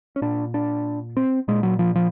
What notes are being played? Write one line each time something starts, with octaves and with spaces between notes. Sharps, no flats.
C#4
A#2 D4
D4
C4
A#2 G#3
F#3
F3
F3